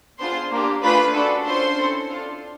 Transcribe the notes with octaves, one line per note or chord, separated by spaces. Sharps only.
B3 D4 F4 G#4 C5 C6
A#3 D4 G4
A3 D4 F4 G#4 B4 B5
D4 F#4 A4
C#4 F4 A4 C5 C6
C4 E4 A4
D4 F4 A4